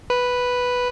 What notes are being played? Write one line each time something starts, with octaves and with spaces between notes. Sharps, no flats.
B4